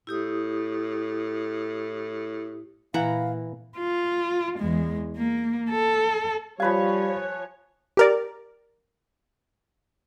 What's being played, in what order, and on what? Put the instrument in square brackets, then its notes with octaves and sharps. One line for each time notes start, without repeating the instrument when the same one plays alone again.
[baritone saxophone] A2 [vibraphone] E4 G4 D#6
[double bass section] A#2 [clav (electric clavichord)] E3 [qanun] E4 F#5 A#5 [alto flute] F5
[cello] F4
E2 G#3
A#3
A4
[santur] F3 B4 G#5 [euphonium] G3 [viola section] C#5 [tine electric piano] F5 B5
[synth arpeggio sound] G4 A#4 D5